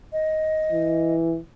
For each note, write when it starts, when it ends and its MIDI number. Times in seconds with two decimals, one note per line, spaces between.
0.13 1.14 75
0.72 1.38 52